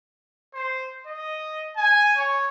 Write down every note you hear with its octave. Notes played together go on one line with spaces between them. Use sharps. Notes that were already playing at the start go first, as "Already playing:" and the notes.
C5
D#5
G#5
C#5